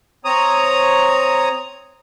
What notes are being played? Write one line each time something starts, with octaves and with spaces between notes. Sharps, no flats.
C4 C#5 A#5 D#6